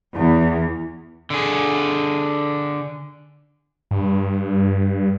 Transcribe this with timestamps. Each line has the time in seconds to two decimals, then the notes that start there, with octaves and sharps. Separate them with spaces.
0.14 E2
1.30 D3 G#4
3.91 G2